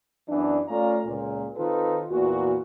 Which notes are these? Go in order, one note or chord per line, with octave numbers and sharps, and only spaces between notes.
F#2 E3 B3 D4
A3 C#4 F4 D5 F5 A#5
C#2 A#2
D#3 C4 D#4 F4 A4 B4
E2 A#2 F#4